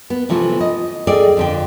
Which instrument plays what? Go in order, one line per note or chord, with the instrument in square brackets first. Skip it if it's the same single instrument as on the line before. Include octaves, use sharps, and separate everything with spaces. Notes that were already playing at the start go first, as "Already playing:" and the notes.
[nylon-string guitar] B3
C3 E3 F3 A3
D#5
G#4 A4 D5 D#5 G5
F2 D3 G5